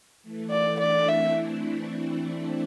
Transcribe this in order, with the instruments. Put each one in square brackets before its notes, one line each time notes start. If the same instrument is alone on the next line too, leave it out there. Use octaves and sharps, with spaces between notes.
[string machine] E3 A3
[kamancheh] D5
[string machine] A3 D4 [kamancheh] D5
[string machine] C4 E4 [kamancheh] E5